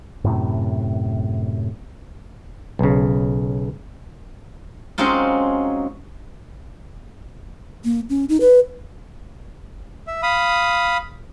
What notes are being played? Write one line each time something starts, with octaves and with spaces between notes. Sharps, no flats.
F#2 A2 C3
B1 C#3
F#3 G#3 C4 C#4 D#4 F4
A#3
C#4
D#4
B4
E5
F5 B5 D#6